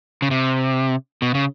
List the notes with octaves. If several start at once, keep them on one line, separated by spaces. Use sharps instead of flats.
C#3
C3
B2
C#3